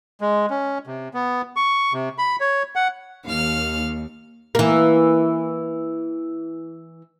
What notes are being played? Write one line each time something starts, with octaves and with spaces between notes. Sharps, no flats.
G#3
C#4
C3
B3
C#6
C3
B5
C#5
F#5
D#2 F5 F6
E3 A#3